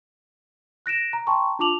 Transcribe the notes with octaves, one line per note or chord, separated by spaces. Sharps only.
F#6 A#6 D7 E7
A#5
G5 A5 A#5 C6 C#6
D4 F4 A5 D6 F7 F#7